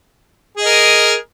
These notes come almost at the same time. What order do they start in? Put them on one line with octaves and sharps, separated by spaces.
G#4 D#5 A#4